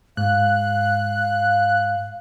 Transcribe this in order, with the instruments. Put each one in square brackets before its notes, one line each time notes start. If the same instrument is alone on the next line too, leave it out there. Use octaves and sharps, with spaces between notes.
[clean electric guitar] G#2 [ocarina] F5 [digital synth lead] F#6